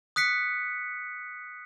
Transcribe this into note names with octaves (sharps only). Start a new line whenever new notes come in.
D#6 F#6 B6 C#7